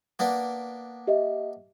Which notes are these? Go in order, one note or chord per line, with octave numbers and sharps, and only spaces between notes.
A#3 B3 D4
G4 D#5 E5